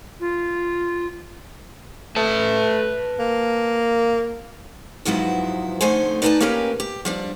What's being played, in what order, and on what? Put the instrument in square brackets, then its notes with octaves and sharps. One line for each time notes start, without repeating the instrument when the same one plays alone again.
[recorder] F4
[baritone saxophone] A3 [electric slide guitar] B4 A5
[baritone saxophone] A#3
[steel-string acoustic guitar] E2 G#2 F3 F#3 B3 E4
F2 D3 A3 D#4 C5 G#5
D#4 B4 D5 F#5 G#5 A5
A#3 C#4 G4 A#4 B4
G4
F3 G3 D4